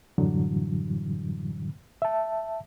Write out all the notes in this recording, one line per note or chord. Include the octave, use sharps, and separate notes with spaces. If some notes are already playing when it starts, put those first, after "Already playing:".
F#2 A2 D3 E3 F#3 G3
E5 A5